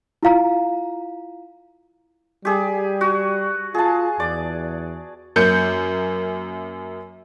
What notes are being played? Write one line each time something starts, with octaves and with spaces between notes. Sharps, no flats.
E4 F4 F5 A#5
G3 G4 G#4
F#4
F4 G#4 A5
E2 D5
F#2 A#3 G6 C#7